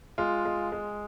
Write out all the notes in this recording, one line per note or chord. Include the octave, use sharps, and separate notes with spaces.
G#3 F4
G#3
G#3